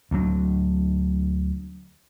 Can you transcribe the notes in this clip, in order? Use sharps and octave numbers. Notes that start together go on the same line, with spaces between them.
D2 F#3